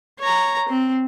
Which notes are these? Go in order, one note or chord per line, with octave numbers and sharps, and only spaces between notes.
C#5 A#5
C4